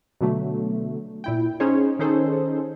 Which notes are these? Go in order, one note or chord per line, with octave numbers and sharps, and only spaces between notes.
B2 D3 F#3 A3
A#2 E4 G5
C#4 D#4 G#4 C5 C#5
D#3 C#4 D#4 G#4 A4 C5